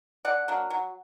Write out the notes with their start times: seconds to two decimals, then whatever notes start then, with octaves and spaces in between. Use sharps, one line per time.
0.25 D3 D5 F#5
0.48 F#3 A#3 D4
0.70 F#3